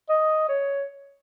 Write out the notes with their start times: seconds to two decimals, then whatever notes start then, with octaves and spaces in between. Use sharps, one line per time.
0.10 D#5
0.49 C#5